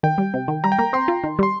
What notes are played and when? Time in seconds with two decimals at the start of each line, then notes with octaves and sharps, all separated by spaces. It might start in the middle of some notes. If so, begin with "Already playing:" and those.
0.03 D#3 G5
0.18 G3
0.34 C3
0.48 D#3
0.64 G3 A#5
0.72 G5
0.79 A#3 A#5
0.93 C4 C6
1.08 F4
1.24 D#3
1.39 G3 C6